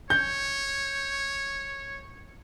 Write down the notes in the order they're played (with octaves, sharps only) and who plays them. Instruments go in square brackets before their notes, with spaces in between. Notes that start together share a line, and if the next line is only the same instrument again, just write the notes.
[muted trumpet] C#5 [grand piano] G6